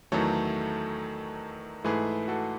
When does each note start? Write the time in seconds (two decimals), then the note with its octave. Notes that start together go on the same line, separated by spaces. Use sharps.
0.12 E2 D#3 F#3 A3 A4 C#5
1.84 G#2 E3 A3 G#4 B4
2.28 F#4 A4